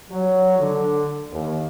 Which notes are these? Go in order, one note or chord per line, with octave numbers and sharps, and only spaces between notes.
F#3
D3
D#2